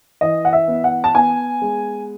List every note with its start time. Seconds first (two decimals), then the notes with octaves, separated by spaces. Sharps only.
0.21 E3 D#5
0.45 F#5
0.53 E5
0.68 B3
0.84 F#5
1.04 A5
1.15 B3 G#5
1.62 G#3